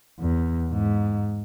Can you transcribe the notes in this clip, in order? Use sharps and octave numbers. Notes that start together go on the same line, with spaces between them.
E2
G#2